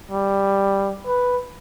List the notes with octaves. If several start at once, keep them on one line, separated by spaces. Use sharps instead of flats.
G3
B4